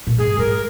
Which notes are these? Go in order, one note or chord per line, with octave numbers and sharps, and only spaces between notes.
A#2
G#2 G#4
G#2 A#4